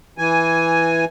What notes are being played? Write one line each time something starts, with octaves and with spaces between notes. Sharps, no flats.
E3 G#5